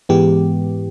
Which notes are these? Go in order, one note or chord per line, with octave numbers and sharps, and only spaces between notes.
G#2 E3 G#3 B3 G4